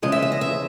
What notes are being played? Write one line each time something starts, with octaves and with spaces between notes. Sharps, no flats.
E2 C#3 F3 G#3 D#5
E5
E5
D#5
E5